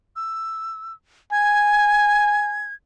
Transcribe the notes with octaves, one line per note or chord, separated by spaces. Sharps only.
E6
G#5 G#6